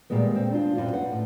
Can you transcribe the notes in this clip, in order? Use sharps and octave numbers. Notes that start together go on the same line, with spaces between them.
A#2 D#3 G3 G#3 B3
C4
D4 F4
F#2 A#2 G3 C4 F4
B4 F#5
A2